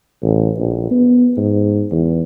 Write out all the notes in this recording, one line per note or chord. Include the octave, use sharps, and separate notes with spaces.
A1
A#1
B3
G#2
E2